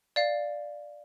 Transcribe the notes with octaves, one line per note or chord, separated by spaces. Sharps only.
D5 F5